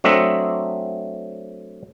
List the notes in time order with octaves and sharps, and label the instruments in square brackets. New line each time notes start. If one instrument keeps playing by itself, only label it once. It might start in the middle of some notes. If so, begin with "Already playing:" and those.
[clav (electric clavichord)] F#3 A3 C4 D4 D#5 E5